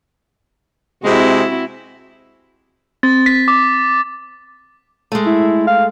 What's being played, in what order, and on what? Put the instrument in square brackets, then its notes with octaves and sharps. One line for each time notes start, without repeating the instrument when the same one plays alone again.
[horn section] C3 G#3 [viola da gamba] C4 E4 F#4
[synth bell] C4 [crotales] A6
[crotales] B6
D6
[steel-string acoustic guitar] G#3 A3
[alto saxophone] E4
F5